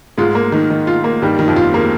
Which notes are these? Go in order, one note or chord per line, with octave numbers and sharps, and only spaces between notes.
G#2 G#3 F4
A#3
D#3
D#3
F4
A#3
G2 D#3 G3
D#3
F2 F3
F4
G#3 A#3